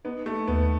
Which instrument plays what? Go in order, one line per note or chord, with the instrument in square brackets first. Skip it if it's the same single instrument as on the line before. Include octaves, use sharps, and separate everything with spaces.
[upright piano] B3 [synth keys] D#4
[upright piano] A3
[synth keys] D#2 [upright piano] B3